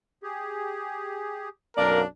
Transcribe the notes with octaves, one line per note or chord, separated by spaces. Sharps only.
G4 G#4
B1 F#2 A#3 D4 A#4 D5